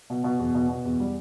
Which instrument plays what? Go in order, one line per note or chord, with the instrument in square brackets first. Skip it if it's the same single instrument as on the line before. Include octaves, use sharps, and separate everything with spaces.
[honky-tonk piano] B2
B2
E2
B2
B2
E2
G3